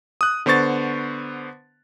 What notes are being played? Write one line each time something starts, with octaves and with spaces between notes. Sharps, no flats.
D#6 F#6
D3 B3 C5 C#6 A6